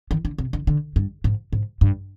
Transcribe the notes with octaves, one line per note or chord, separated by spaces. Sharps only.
D#3
D3
C3
D3
D3
G2
G#2
G#2
G2